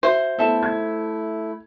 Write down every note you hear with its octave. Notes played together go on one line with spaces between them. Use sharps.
F#4 C5 E5
A3 B3 E4 A4 E5 A5
G#6